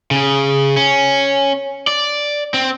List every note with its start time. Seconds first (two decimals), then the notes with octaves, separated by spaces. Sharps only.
0.11 C#3
0.77 C#4
1.87 D5
2.54 C4